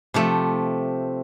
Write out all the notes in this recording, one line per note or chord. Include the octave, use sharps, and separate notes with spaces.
C3 F3 A3